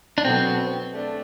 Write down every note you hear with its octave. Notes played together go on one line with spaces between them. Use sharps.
D4
B2 F#3 B3 C4 F#4 A4
A3 D4